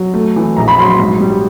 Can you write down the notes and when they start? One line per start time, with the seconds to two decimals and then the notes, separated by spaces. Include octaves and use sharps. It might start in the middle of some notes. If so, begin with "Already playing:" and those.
Already playing: F#3
0.14 A3
0.36 E3
0.57 A#1 A#5
0.68 B5
0.79 F#3 C6
0.89 C6
0.99 G#2
1.20 G3